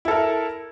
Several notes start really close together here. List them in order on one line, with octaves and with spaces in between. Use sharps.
E4 A4 A#4